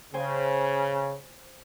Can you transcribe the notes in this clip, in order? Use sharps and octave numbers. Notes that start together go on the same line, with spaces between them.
C#3 C5 G5 G#5